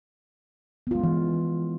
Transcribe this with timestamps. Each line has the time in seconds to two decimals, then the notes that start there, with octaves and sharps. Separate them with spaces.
0.87 B3
0.91 F4
0.95 G#3
0.99 C#4
1.03 E3